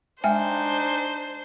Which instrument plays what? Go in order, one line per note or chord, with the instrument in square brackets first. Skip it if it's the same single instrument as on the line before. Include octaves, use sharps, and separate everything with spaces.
[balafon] G#3 E5 G5 [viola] D4 D#4 [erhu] C5 [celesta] G#5